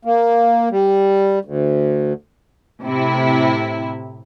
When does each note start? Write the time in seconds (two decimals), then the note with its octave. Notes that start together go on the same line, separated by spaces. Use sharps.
0.05 A#3
0.71 G3
1.45 D2
2.83 A2 C3 E4